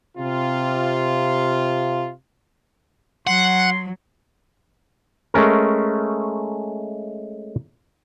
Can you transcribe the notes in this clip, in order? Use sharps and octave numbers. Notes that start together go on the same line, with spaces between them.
C3 F4
F#3 F#5 C6
G#3 A3 C#4 A#4